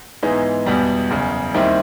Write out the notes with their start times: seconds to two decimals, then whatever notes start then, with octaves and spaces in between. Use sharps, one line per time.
0.23 G#2 E3 G#3 B3 D#4
0.66 E2 B2 G3 B3
1.10 F#1 E2 C#3
1.54 D#2 D#3 G3 C4 E4